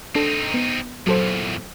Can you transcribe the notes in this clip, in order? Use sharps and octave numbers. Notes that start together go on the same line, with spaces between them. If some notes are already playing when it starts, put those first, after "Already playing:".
C4 D4 D#4 A4
B3
E2 A#2 F#3 A4 C5